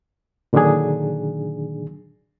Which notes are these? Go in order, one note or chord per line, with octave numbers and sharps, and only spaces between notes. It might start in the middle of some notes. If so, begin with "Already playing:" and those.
A#2 D3 D#3 F#3 D4 G#4